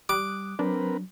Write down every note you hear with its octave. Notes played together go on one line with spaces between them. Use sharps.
G3 D6 D#6 F#6
F#3 C4 D4 A#4 B4